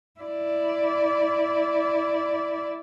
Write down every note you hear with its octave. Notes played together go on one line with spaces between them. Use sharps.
E4 D5